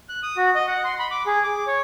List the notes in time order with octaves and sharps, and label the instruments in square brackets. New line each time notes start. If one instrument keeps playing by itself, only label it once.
[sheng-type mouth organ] F#6
D#6
F#4
D#5
F#5
C6
B5
D6
G#4
D6
C#5